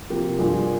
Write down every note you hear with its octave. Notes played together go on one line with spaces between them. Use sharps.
C3 F3 A#3 G4 A#4
G2 F3 A#3 F4 G#4